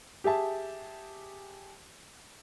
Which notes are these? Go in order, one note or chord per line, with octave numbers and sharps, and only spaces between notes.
G4 G#4 E5 A5